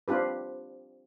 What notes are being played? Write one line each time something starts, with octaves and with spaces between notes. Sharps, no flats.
C4 D4 F4 G4 B4